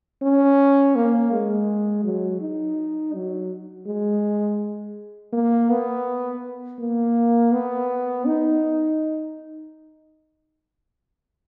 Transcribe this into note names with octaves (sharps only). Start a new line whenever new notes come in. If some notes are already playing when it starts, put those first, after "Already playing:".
C#4
A#3
G#3
F#3
D#4
F#3
G#3
A#3
B3
A#3
B3
D#4